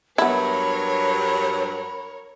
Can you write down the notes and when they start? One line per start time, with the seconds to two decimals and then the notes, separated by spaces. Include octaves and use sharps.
0.18 G2 F#3 B3 E4 A#4 C#5 B5